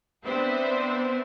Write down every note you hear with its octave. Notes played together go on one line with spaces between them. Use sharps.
B3 C4 D4 B4 C5 E5